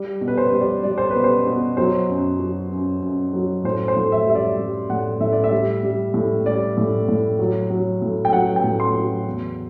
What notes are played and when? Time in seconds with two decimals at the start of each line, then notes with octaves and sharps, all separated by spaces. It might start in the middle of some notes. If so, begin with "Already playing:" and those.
Already playing: G3
0.21 B2
0.28 B4
0.38 C5
0.52 G3
0.61 D5
0.83 G3 D5
0.98 C5
1.10 B4
1.15 B2
1.24 C5
1.47 B2
1.77 F#3 C5
2.09 F#2
2.40 F#3
2.71 F#2
3.02 F#2
3.33 F#3
3.64 A2 C5
3.88 C5
3.97 A2
4.12 E5
4.27 G3 E5
4.35 D5
4.59 G3
4.89 A2 F#5
5.20 A2 E5
5.32 D5
5.44 E5
5.51 G3
5.83 G3
6.14 A2
6.46 G3 D5
6.77 A2
7.09 A2
7.39 F#3
7.71 F#3
8.02 A2
8.25 G5
8.33 F#3 F#5
8.56 G5
8.64 A2
8.80 C6
8.95 F#3
9.26 E2